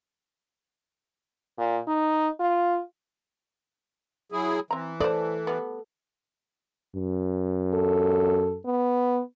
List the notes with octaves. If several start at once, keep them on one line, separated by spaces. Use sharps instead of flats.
A#2
D#4
F4
F#3 E4 G#4
E3 C4 A#5
A4 C5 D5
G3 B3
F#2
A4
B3